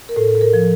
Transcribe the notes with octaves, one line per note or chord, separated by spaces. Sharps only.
A#4
A2 A4
A4
A#4
F3